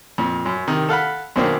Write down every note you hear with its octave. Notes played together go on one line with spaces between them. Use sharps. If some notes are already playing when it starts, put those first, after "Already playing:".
F2 A#2
F#2
C3 D#3
A4 F5 F#5 B5
F#2 B2 D#3 A#3 C4 D4